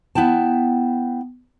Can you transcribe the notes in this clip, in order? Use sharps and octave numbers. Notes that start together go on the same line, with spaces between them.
B3 E4 G5 A5